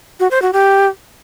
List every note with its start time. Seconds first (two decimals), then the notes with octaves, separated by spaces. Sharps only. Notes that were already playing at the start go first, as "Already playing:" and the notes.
0.20 F#4
0.31 C5
0.42 F#4
0.53 G4